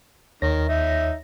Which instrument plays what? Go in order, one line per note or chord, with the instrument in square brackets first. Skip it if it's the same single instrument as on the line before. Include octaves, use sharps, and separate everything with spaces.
[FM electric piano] D#2 C#5 A#6 [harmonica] D#3
[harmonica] D#4 E5